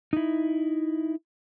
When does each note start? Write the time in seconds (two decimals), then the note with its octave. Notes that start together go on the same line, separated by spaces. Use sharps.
0.13 D#4 E4